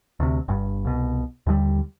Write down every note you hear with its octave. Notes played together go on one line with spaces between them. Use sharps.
D2 C3
G1 G2
C2 B2
D#2 D3 D#3 G3